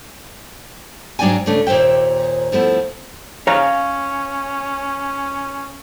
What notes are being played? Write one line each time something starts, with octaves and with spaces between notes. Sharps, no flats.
G#2 F#3 D4 D5 G5 G#5
C#3 A3 D4
D#2 A#2 C5 E5 G5
F3 A3 B3 E4
C#4 C#5 F5 A#5